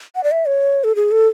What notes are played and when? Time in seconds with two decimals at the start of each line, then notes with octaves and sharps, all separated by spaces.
0.15 F#5
0.24 D5
0.31 E5
0.47 C#5
0.84 A4
0.95 G#4
1.11 A4